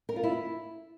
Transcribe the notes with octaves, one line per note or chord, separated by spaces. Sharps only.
A#4
F4
E4